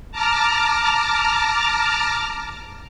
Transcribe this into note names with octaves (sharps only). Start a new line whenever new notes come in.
A5 A#5 D6 F6